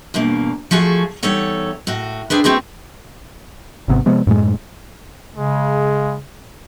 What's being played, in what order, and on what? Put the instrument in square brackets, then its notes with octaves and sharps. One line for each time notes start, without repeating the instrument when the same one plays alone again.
[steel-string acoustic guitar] E2 G2 B2 A#3
F3 A3 F#4 G#4
E2 G3 D#4 A4 C#5 F#5
A2 F#4
C4 D4 G#4 B4
A3 C4 F#4 G#4 B4
[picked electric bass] G#1 C3 B3
C3 F3 G#3 B3
F#2 A2 G#3
[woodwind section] C#3 [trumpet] G#3